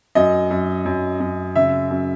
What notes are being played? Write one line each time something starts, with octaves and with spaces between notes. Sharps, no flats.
F#2 D#5
F#2
F#2
F#2
C#3 E5
F#2